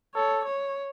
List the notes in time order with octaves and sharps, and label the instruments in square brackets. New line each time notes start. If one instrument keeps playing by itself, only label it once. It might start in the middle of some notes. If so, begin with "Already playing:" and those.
[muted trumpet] A4 [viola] C#5
[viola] C#5